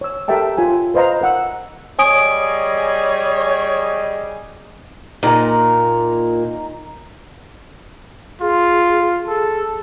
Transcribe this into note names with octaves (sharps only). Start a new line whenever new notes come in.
C#5 E6
G4 A4 A#4 E5 G5 A5
F4 C#5 G#5
B4 C5 D#5 F5 A#5
A#4 F#5 E6
G3 G#4 C#5 D#5 G#5 D#6 D7
A#2 D#4 A#5
F4 G#4
G#4 A4